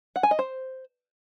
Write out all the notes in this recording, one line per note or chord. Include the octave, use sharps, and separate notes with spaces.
F#5
G#5
D#5
C5